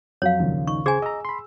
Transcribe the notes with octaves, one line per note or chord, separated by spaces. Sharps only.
F2 F#3 C#5 F5
A#1 D#2 C#3
D#4 C#6
C#3 G#4 C5 G#5 G#6
D#5 A#5 E6
B5 C6